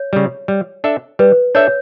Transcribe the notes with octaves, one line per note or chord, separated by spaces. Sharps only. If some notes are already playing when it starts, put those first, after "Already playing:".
Already playing: C#5
C#3 G3
G3
D4 A4 E5
G3 B4
D4 A4 C#5 E5